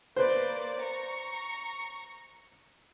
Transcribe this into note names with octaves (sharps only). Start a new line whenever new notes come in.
A#3 B4 C5 D5
A#5 C#6